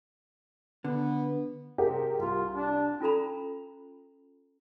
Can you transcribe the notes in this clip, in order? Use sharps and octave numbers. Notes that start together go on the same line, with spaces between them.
D3 B3
C3 G4 G#4 A#4
C2 F4
D4
C#4 F4 A4 A#5 B5